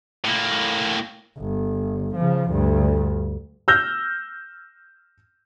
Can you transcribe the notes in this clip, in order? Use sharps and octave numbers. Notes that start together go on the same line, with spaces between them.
A2 A#3
G1
C#3 F3
D2 G2
E6 F6 G6 A#6